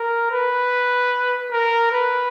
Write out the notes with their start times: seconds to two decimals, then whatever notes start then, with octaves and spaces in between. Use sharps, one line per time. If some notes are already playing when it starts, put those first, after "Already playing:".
Already playing: A#4
0.31 B4
1.51 A#4
1.91 B4